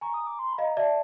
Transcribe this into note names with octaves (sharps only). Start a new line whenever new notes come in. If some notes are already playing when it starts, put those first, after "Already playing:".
G#5 A#5 C#6
D#6
D6
C6
B5
D#5 F5
A#5
D5 E5 A5